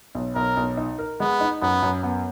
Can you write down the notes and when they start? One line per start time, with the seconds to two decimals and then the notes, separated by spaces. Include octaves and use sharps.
0.15 B1
0.35 B1 A#4
0.57 B1
0.77 D#4
0.99 A#4
1.20 G#3 B3
1.41 D#4
1.62 F#2 B3
1.82 F#2
2.03 B3